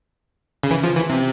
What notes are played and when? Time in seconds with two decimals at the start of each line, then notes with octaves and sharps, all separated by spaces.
0.63 C#3
0.71 E3
0.84 F3
0.96 E3
1.10 C3